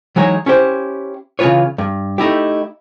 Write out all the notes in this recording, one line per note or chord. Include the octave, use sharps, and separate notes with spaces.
E3 F#3 G#3 D#4 C#5
C#4 E4 G4 C5
C#3 E3 F3 F4 B4 C#5
G2
A3 D#4 E4 G4